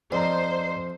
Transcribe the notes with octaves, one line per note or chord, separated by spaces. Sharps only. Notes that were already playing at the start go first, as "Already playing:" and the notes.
F2 C5 D5 D#5 A#5